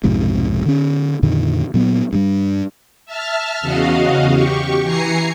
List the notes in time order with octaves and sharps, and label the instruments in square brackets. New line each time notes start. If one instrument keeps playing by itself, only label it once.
[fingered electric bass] B1 F2 G#2 C3
D3 C#4
F2 A#2 D3 D#3
A#2 F#3 B3
G2 G3
[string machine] E5 A5 F6
E2 C#3 F#4 D#5 F5
G4 C#6
E3 G#5 A#5 C7 C#7